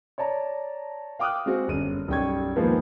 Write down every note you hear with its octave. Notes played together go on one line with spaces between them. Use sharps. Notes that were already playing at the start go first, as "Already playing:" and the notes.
C#5 D5 A5 A#5
F5 G5 D6 D#6 F6 F#6
G#3 C4 F#4 G#4
G1 F#2 D#7
B1 F#2 G3 G5 C#6 G#6
D#2 G#2 F3 G#3 A#3 B3